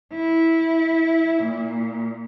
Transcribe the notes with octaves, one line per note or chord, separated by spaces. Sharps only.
E4
A#2